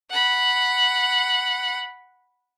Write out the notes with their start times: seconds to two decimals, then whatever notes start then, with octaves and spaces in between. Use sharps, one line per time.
0.10 F#5 B5